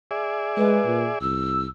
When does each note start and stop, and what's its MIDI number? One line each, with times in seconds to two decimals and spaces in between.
0.11 1.19 68
0.11 1.19 74
0.11 1.19 76
0.57 0.80 56
0.57 1.01 71
0.86 1.08 46
1.21 1.66 36
1.21 1.67 88